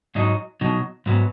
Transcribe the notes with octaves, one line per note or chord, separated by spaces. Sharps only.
G#2 F#3 D#4
B2 F#3 D#4
G#2 F#3 B3